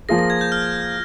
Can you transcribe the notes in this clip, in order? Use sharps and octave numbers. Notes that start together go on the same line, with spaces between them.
F3 A#3 F4 G#4 A#6
A#6
G#6
G6
F6